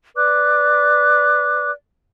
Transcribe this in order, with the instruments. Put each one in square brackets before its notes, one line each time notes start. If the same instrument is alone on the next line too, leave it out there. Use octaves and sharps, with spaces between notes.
[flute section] B4 D5 D6 F#6